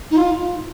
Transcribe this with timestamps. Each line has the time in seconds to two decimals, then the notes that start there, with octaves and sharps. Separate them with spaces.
0.11 D#4
0.16 F4